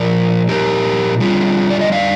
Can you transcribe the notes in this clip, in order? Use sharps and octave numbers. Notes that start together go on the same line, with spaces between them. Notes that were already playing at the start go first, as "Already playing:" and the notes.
Already playing: A#2 F3 A#4 D5
G4 A#4
D3 G3 F4 G#4
D5
D#5
D5 F5